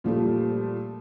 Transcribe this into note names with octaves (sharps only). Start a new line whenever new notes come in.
A#2 F3 G3 A3